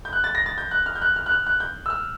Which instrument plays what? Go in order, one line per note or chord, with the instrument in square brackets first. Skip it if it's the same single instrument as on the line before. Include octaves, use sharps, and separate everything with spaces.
[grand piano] G6
F#6
A6
A#6
A6
G6
F#6
F6
G6
F#6
F6
F#6
F6
F#6
G6
E6
F6